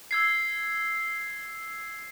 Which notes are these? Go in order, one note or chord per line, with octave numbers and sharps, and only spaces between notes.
E6 G#6 C7